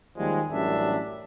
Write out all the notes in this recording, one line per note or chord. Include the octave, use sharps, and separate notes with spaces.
D#2 F3 G3 G#3
A1 F#2 G3 D4 E5